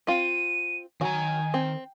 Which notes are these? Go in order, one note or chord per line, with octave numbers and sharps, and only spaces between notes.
C4 F4 D#7
D#3 F#3 F#4 G#5 A#5
C4